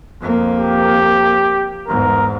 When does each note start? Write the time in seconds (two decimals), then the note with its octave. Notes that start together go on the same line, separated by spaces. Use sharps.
0.21 F2 A#3
0.59 G4
1.88 E2 G#2 A#4